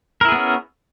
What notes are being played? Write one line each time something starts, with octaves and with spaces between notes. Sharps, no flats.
B3 C#4 E4 G#4 A#4